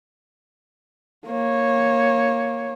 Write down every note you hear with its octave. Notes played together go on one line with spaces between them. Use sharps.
A#3 C#5